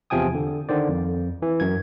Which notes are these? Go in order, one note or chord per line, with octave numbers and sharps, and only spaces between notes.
E2 C3 F3 G5 G#5 D#6
D3
D3 D#3 C5 D5
F2
E3
F#2 G#6